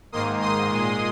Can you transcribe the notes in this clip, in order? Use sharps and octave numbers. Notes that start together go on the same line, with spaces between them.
G#2 D#3 A#3 C6 D#6
C6 D#6
A#2 G#3